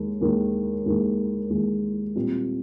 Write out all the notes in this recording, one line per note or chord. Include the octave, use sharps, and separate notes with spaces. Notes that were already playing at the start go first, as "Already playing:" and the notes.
Already playing: D#2 D#3 G#3
D#2 D#3 G#3
D#2 D#3 G#3
D#2 D#3 G#3
A#2 G3 C4 F4